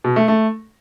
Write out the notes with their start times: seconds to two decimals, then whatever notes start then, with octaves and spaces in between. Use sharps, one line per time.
0.04 B2
0.16 A3
0.28 A3